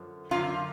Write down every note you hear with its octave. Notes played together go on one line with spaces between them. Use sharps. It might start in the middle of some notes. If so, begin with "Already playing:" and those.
Already playing: F#2 D3 F3
F#2 D3 F3 F4